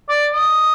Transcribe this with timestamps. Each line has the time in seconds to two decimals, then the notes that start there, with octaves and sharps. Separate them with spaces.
0.09 D5
0.33 D#5